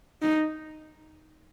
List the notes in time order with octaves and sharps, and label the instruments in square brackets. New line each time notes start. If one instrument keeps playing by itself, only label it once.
[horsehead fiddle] D#4